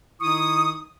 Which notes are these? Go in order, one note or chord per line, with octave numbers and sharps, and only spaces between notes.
D#3 D#4 E4 C#6 D#6